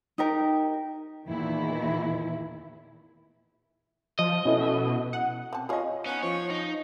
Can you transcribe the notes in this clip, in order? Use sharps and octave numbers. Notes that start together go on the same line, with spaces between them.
D#4 G4 A#4
E2 A#2 D#3 E4
F3 D#5
B2 C#4 E4 A4
F#5
C4 A5
C#4 F4 G#4 C#5 D#5
B3 C#4 D#4
F3 C#5
D#4